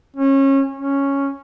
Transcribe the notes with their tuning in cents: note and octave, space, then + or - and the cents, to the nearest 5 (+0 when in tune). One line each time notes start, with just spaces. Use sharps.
C#4 -25
C#4 +0